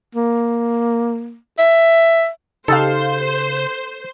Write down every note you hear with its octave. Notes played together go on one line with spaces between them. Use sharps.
A#3
E5
C#3 D#4 G4 A4 C5 F5